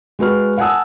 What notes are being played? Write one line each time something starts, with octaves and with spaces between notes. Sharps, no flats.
G#3 F#4 B4 F6
F5 F#5 G#5 A5 D#6 E6